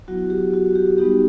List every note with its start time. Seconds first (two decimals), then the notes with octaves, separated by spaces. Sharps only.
0.08 F#3 B3 E4 F#4
0.30 G4
0.53 F#4
0.75 G4
0.98 G3 B3 D#4 F#4 G4